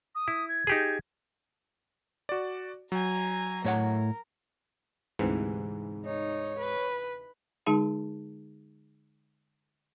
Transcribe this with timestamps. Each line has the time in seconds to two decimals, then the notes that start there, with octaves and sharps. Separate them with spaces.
0.15 D#6
0.28 E4
0.48 G#6
0.67 D#4 G4 G#4
2.29 F#4 D5
2.92 F#3 G#5 A#5
3.65 A2 A#4 C#5 F#5
5.19 D2 G#2 C3 E3
6.06 D#4 C#5
6.59 B4
7.66 D3 G#3 D#4 G#4 A5